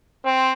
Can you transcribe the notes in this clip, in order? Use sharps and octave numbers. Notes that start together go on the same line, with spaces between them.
C4